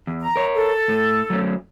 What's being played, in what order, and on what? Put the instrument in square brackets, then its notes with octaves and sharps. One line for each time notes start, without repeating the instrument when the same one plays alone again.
[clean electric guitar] E2
[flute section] A#5
[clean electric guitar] A#4 C#5
[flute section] A4
[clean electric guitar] A2
F#3 A3 C#4